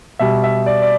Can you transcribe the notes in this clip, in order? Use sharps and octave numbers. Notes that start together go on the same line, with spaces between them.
B2 G3 E5
E5
D5
D5